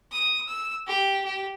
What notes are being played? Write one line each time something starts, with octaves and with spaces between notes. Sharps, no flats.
D#6
E6
G4
G4